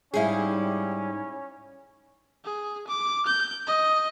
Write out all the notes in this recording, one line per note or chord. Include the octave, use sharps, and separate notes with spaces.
G#2 G3 C#4 D#4 E4 G#4 F5
G#4
D6
G6
D#5